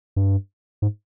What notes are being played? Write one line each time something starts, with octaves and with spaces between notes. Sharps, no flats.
G2
G#2